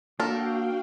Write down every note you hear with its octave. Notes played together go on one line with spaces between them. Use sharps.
A#3 D4 F#4 A4 A#4 F5 G5